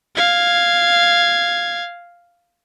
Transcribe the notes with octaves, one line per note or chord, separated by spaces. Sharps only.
F5 G#6